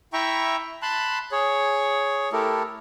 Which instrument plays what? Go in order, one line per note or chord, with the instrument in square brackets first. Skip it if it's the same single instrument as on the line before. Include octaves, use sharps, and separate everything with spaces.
[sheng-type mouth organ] E4 E5 G5 A#5 C#6
A5 B5 C6 F#6
G#4 C#5
A3 E4 G4 A4 A#4